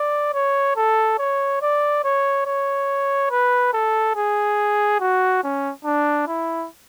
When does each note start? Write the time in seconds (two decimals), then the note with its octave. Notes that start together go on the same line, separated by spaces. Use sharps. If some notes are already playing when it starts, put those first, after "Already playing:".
Already playing: D5
0.34 C#5
0.76 A4
1.19 C#5
1.62 D5
2.04 C#5
2.46 C#5
3.31 B4
3.73 A4
4.16 G#4
5.00 F#4
5.44 C#4
5.85 D4
6.28 E4